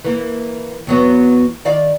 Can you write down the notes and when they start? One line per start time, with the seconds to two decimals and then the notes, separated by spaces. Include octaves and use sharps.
0.05 E3 A#3
0.87 E2 F#3 B3
1.65 D#3 D5 F5